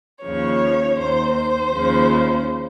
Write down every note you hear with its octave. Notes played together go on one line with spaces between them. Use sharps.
D#2 C#3 F3 C#5
D#2 D#3 C5
C5
D#2 C#3 F3